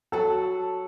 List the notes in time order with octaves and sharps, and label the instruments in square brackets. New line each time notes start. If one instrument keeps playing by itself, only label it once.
[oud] F#3 F#4 [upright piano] A4 A5